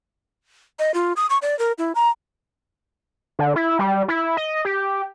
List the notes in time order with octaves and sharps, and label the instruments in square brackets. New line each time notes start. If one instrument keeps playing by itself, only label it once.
[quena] D#5
F4
D#6
C#6
D5
A#4
E4
A#5
[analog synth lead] D3
E4
G3
E4
D#5
G4